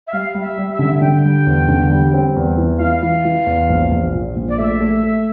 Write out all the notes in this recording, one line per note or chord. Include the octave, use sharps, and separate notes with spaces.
E5
G3 F5
G3
E5
G3
E5
D3
D3 G5
G3
E2
D3
G3
C4
E2
E3
E3 F5
E3
E3
E2
A#1
A#1
A#2
A#1
D5
A3 E5
A3
A3